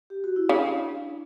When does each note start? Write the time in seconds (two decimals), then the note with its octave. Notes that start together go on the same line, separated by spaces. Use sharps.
0.10 G4
0.24 F#4
0.36 E4
0.49 C#3 D4